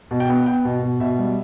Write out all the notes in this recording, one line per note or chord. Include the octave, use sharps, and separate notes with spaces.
B2
G5
B3
B3 G5
B2
B2
B2 E5
G3